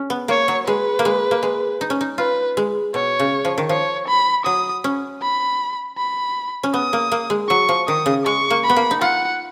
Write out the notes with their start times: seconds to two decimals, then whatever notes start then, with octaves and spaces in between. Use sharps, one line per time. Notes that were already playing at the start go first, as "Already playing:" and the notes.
Already playing: C#4
0.10 B3
0.28 A#3 C#5
0.48 F#3
0.67 G#3 B4
0.99 A#3
1.05 G#3
1.31 A#3
1.43 G#3
1.81 D#4
1.90 C#4
2.01 D#4
2.18 F4 B4
2.57 G#3
2.94 B2 C#5
3.20 C#3
3.45 F3
3.58 D#3
3.69 F3 C#5
4.08 B5
4.45 F#3 D#6
4.84 C#4
5.22 B5
5.98 B5
6.63 C#4
6.73 B3 D#6
6.93 A#3
7.12 A#3
7.30 G#3
7.49 F#3 C#6
7.69 F3
7.88 D#3 D#6
8.06 C#3
8.25 G#3 C#6
8.50 A#3
8.64 B5
8.69 B3
8.76 A#3
8.91 D#4
9.01 F4 F#5